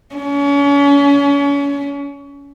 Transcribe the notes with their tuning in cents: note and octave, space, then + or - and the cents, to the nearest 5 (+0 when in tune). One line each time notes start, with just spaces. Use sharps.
C#4 +35